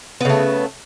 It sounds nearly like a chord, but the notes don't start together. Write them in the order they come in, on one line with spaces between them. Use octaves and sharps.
B3 C#3 A3